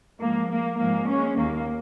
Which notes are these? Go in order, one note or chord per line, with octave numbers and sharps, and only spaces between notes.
G#2 F3 A#3
A#3
G#2 F3 A#3
G#3 C#4
D#2 D#3 A#3